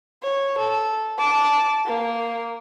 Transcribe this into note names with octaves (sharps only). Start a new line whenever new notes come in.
C#5
A4
A5 D6
A#3